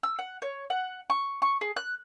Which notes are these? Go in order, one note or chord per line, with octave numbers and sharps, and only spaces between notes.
E6
F#5
C#5
F#5
C#6
C#6
G#4
F#6